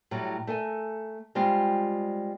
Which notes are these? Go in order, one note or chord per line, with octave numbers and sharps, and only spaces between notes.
A2 F#3 G3
A3 A4 A#4 G#5
G3 G#3 C4 F4 G4